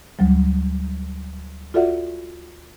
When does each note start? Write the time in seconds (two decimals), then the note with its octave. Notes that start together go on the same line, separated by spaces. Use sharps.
0.19 D2 F#3 G3
1.74 F4 F#4 A4 D5 E5 F#5